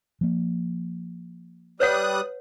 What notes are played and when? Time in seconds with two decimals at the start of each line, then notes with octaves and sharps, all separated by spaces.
0.21 F3 A#3
1.80 G3 B4 C#5 F#5 D#6 F#6